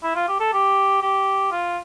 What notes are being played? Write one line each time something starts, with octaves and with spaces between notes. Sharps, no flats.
E4
F4
G4
A4
G4
G4
F4